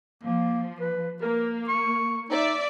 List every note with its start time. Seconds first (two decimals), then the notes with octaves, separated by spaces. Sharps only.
0.23 F3 A#3
0.80 B4
1.22 A#3 A#4
1.68 C#6
2.30 D#4 D5 E5